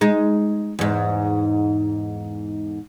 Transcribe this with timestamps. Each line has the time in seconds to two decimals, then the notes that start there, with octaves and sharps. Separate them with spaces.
0.01 G#3 D#4
0.79 E2 G#2